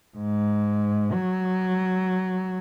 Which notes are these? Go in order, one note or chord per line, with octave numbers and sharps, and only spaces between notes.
G#2
F#3